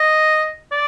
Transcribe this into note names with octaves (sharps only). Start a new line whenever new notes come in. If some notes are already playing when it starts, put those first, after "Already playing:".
Already playing: D#5
D5